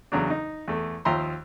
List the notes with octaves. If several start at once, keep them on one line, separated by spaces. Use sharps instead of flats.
E2 C#3 F#3 D4
D#4
E2 A3
D#2 F3 E5 G5 A#5 C6